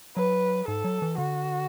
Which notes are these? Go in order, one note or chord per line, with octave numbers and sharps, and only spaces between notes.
F#3 B4
G#2 A4
F#3
E3
D3 F#4